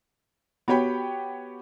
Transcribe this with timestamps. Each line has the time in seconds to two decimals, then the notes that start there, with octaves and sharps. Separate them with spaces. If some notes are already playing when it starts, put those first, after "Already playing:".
0.68 B3 F#4 G4 C#5 G5 B5